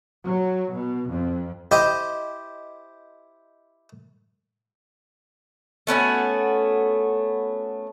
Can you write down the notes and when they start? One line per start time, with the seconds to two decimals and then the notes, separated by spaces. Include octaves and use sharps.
0.24 F#3
0.72 B2
1.11 F2
1.71 E4 G4 C5 D#5
5.87 A3 B3 C#4 F#4